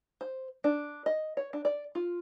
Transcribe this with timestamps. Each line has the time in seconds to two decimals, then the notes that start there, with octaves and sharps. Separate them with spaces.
0.21 C5
0.64 D4
1.06 D#5
1.37 C#5
1.53 D4
1.65 D5
1.95 F4